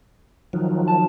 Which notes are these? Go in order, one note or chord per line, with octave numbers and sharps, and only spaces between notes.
D#3 F3 F#3
A5